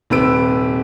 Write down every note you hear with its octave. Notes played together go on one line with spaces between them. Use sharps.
D#1 C3 B4 E6 D7